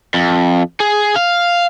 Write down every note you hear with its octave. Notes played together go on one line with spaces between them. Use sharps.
F2
G#4
F5